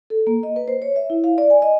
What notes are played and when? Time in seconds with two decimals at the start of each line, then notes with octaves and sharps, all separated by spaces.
0.10 A4
0.27 A#3
0.43 D#5
0.56 B4
0.68 C5
0.82 C#5
0.96 E5
1.10 E4
1.24 F5
1.38 D5
1.50 G#5
1.62 D#5